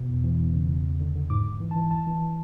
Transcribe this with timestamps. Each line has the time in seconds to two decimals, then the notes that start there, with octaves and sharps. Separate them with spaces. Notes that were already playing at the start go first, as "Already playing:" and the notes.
Already playing: B2
0.09 E2
0.24 E3
0.40 E2
0.54 C#3
0.69 E2
0.85 E2
1.00 D3
1.15 D3
1.30 G#2 D6
1.46 G#2
1.60 E3
1.71 A5
1.76 E3
1.91 D2 A5
2.07 E3